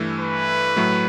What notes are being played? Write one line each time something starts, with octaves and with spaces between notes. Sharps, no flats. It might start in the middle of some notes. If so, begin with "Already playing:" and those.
Already playing: G2 E3 A3
B4
A2 F#3 A3